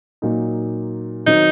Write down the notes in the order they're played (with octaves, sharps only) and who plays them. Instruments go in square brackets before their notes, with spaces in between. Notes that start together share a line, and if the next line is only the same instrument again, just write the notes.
[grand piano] A#2 F#3 A#3 D#4
[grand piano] D#3 F#3 C4 [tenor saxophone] D#4